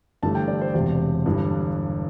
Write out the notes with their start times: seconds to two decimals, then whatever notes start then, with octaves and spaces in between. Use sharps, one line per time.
0.22 G1 G2 E3 A3 A5
0.35 G5
0.48 D5
0.61 C5
0.74 E1 E2 C3 C5
1.26 G1 G2 E3 G3